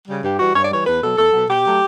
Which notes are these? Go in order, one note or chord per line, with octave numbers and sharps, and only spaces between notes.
C#3 G3
G2 G4
E3 G3 F#4
G2 C#5
D5
E3 G3 C#5
E2 B4
B2 F#3 A4
E2 A4
B2 F#3
B2 G4
F#3 A3